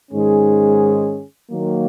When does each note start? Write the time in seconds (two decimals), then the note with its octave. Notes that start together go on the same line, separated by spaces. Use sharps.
0.11 G#2 D#3 G#3 C#4 G#4
1.52 D#3 F#3 A#3